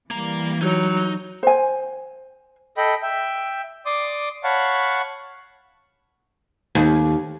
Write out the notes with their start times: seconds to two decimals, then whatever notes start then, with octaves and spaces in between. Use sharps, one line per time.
0.11 E3 G3 A#3 A#5
0.61 F#3 D#4
1.43 C5 G#5
2.77 A4 D#5 G5 B5
3.02 E5 G5
3.86 D5 C6 D6 D#6
4.44 C#5 F5 F#5 A5 B5 C#6
6.75 D#2